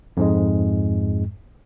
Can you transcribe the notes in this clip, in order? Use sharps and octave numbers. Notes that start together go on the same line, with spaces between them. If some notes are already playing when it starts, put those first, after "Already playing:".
F2 G#2 G#3